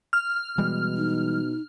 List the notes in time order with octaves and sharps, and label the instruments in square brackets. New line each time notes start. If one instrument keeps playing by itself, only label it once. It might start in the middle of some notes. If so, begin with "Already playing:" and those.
[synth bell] F6
[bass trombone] B2 [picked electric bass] E3 G3 G#3
[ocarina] D#4